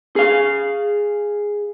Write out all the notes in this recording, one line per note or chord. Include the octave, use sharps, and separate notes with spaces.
G#4 F5